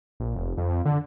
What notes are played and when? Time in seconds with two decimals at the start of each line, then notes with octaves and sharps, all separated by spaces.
0.20 A#1
0.35 F1
0.57 F2
0.70 F2
0.85 D3